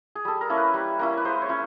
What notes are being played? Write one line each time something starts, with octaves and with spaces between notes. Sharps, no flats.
G#4
G3 A4
A#4
A#3 C#4 E4
B4
G3
A#3 C#4 E4
B4
G#3 C5
C#5
C#4 E4